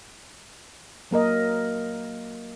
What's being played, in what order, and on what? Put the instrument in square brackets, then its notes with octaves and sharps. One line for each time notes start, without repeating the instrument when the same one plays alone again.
[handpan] F#3 A#3 A#4 D#5